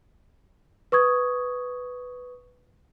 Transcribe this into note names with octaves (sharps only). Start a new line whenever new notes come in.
B4 C#6 D#6 G#6